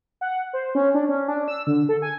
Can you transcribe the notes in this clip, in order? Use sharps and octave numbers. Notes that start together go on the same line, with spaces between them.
F#5
C5
C#4
D4
C#4
D4
E6
D3
A4
G#5